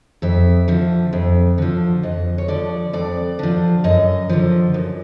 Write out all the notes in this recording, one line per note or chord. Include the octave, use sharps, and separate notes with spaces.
F2 E5
D3 F3
F2
D3 F3
F2 D#5
C#5
D3 F3 D5
F2 D5
D3 F3
F#2 D#5
D3 F3
F#2